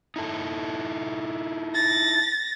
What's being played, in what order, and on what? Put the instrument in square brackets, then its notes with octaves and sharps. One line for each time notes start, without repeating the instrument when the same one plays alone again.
[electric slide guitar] D#4 E4 A4
[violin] A6 A#6